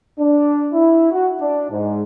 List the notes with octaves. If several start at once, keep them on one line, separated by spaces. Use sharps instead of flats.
D4
E4
F#4
D4
G#2